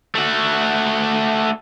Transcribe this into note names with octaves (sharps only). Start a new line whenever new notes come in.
A3 F#4